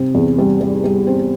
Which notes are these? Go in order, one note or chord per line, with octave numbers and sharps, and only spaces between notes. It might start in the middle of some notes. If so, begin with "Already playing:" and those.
Already playing: C3 C4
E2
G3
G3
G3
C4